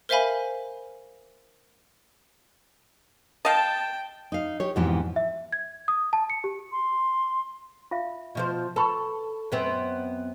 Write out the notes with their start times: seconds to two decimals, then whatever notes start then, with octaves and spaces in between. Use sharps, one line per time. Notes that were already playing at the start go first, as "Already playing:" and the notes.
0.09 A#4 C5 E5 F5 G#5 B5
3.45 D#5 F5 G5 A5
4.32 D#4 F5
4.60 G4 C#5
4.76 F2 G#2 B2 E3 E4 G4
5.16 E5
5.52 G#6
5.88 D#6
6.13 A5
6.30 C#7
6.44 G4
6.72 C6
7.91 F4 E5 F5
8.35 B2 F3 C5
8.76 A4 B4 B5 C#6
9.52 F#2 B3 C4